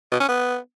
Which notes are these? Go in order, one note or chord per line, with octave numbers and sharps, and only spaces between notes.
B2
C#4
B3